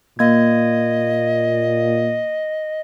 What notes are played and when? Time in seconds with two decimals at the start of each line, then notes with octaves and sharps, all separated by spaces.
0.19 A#2 A#3 D#5 G#6